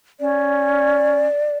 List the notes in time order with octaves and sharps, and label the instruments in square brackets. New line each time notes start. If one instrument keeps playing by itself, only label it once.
[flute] C#4 [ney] D5